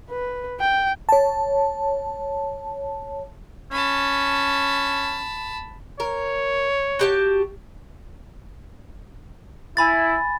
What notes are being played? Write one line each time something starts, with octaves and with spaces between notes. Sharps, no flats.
B4
G5
C#5 A5
C#4 A5 B5
A#4 C#5
F#4 G4 A5
E4 G#5 B5 A6